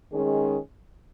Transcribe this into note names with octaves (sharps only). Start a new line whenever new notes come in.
D#3 G#3 C#4 G#4